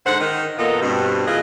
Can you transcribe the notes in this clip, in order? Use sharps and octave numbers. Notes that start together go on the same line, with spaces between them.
G#2 D3 C5 F#5
D#3 D#4
F2 A#2 B3 A4 A#4 D#5
G2 B2 C4
A#2 E3 F4 G#4 D#5